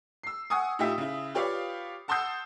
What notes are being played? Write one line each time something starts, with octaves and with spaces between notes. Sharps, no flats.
E6 C7
F#5 G#5 C#6 D#6
A2 D#4 F4 G4 E5 B6
C#3 E4
F4 G4 B4 C#5 D5 F5
F#5 A5 C6 D#6 E6 G6